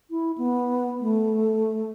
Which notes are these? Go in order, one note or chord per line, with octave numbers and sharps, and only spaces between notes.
E4
B3
A3